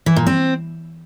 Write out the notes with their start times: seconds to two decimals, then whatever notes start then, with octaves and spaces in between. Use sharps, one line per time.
0.06 E3
0.16 A#2
0.27 C4